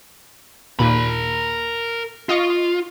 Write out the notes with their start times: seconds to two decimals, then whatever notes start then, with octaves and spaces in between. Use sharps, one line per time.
0.79 D#2 A#2 A#4 B5
2.29 F4 D#5 F5 C#6